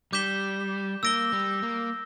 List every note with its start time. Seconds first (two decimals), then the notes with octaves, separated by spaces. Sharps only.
0.12 G3 D6 G6 B6 E7 G7
1.03 A#3 E6 A#6 D7 G7
1.32 G3
1.62 A#3